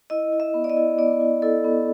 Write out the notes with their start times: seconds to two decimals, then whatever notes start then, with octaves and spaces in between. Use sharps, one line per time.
0.10 E4 D#5
0.32 E4
0.40 E5
0.54 B3
0.64 D5
0.70 D#5
0.77 E4
0.98 B3 D5
1.20 E4
1.42 E4 A4
1.64 B3